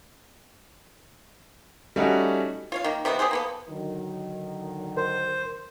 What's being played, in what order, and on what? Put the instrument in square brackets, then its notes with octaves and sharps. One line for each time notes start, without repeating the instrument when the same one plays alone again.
[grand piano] G3 A3 C#4 D#4 F#4
[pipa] F4 C#5 F5
D#3 A#3
C3 D#3 A#3 B3
G3 G4 G#4 C5
A#3 B3 A4
[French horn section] D3 D#3 F#3
[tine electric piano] A#4 [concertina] C5